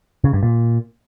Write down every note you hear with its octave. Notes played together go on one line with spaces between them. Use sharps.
C#3
G2
A#2